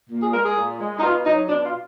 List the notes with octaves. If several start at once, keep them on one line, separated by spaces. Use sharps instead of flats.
A#2
G#4
G#3 A#4
G#4
A#2
G#3
D#4
B2 F4
F#3 D#4
B2 D4
F4